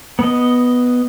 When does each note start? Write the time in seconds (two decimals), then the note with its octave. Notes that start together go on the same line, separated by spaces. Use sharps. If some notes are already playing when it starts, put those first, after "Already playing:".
0.19 B3 D#5